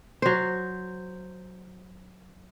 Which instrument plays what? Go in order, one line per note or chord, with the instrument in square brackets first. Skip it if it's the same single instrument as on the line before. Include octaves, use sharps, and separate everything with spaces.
[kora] F#3 C5